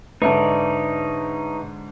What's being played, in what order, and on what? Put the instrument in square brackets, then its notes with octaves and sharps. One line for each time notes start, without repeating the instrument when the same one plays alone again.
[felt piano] G#2 D3 [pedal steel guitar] D#4 C#5 D5 [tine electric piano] B4 E5 A5